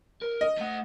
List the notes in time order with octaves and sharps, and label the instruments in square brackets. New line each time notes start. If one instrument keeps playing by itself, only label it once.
[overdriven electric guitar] A#4
[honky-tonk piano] D#5
[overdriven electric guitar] A3 F#5